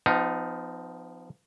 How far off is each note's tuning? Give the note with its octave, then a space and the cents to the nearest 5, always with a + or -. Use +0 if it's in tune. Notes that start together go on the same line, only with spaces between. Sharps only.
F3 +0 B3 +40 D#4 +0